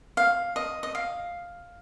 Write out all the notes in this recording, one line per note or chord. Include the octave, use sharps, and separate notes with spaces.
F5
D#5
D#5
F5